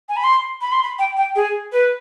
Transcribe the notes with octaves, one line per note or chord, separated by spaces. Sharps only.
G#5
B5
C6
B5
C6
B5
G5
G5
G#4
B4